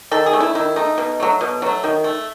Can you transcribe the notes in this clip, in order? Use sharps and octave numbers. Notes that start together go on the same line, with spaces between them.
D#3 A4
G#4
A3
E4
D#3 E4
A3 D#4
B2
F#3 A3
B2
F#3 A3
D#3
A3